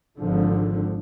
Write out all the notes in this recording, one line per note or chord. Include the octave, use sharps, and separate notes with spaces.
G#1 G#2 D3 F3